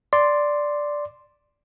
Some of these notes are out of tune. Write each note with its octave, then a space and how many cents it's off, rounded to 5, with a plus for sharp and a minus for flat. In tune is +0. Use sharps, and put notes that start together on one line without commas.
D5 +0 C6 +0